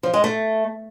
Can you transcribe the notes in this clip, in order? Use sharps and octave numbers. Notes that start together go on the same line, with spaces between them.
F3
G#3
A3